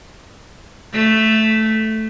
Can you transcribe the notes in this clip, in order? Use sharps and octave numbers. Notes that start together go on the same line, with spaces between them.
A3